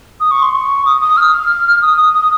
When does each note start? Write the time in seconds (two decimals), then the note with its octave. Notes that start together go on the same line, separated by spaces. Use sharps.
0.20 D#6
0.31 C#6
0.42 C6
0.53 C#6
0.85 D#6
1.01 D#6
1.17 F6
1.82 D#6
1.98 D#6
2.14 D#6